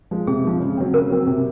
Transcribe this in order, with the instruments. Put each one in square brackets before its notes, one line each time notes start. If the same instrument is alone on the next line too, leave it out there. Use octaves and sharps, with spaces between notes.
[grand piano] F3 G#3
[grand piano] C3 [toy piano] G#4
[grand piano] F3 G#3
C#3
F#3 C4
[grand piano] C#3 [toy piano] A#4
[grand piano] F#3 C4
C3